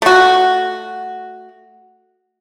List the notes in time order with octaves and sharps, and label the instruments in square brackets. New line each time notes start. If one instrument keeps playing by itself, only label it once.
[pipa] A3 F#4